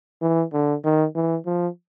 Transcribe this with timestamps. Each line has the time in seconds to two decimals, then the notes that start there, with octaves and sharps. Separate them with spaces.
0.22 E3
0.53 D3
0.84 D#3
1.16 E3
1.46 F3